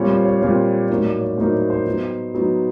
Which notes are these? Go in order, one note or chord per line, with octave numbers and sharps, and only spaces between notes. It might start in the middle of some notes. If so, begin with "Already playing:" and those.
Already playing: A#2 G3 C4 F4 C#5
C5
C#5
A#2 G3 C4 F4 C#5
A2 F#3 A#3 D#4 C#5
D5
C#5
A2 F#3 A#3 D#4 C5
C#5
C5
F#3 B3 D#4
F#3 B3 D#4